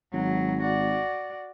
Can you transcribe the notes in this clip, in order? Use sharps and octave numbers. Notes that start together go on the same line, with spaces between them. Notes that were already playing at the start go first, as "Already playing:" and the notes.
G#1 F#3
F#4 D5